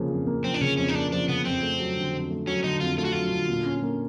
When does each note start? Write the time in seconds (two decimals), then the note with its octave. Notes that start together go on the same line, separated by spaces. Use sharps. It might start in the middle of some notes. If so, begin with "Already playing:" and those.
Already playing: F2 C#3 F3 A#3
0.10 F2
0.27 A#3
0.44 F3 C4
0.54 D4
0.61 C#3 C#4
0.78 F2 C#4
0.88 D#4
0.95 A#3 D4
1.12 F3 D4
1.28 C#3 B3
1.45 F2 C4
1.63 A3
1.79 F#3
1.97 D3
2.13 F2
2.30 A3
2.47 F#3 C#4
2.64 D3 D#4
2.80 F2 F4
2.98 A3 F4
3.05 F#4
3.12 F#3 F4
3.31 D3
3.49 A#2
3.66 C#4
3.83 A#3